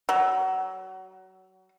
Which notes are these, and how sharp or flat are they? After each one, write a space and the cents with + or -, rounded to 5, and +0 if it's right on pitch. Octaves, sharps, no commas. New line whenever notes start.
F#3 +25